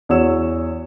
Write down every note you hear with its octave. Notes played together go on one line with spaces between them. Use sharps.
E2 F#4 C#5 E6 E7